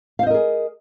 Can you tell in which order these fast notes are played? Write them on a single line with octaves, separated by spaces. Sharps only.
F5 C5 D#5 A#4 G#4